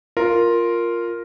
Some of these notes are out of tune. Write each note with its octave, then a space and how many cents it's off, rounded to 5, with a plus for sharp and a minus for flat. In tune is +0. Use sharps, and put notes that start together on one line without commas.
F4 +0 A#4 +0